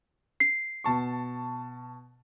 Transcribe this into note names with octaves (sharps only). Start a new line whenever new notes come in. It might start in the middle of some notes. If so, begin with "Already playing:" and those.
C7
B2 A5 C#6